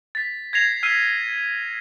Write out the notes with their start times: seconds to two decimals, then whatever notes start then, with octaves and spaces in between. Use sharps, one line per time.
0.15 A6 B6
0.53 G#6 A#6 C7 F7
0.83 E6 F6 B6 C7 D#7